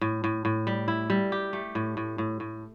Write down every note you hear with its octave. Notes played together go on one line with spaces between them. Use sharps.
A2
A2
A2
G3
E4
G3
G4
A3
A2
A2
A2
A2